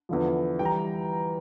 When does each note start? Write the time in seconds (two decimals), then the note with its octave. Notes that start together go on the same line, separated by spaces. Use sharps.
0.09 E2 D3 F3
0.59 E3 G3 G5
0.65 A#5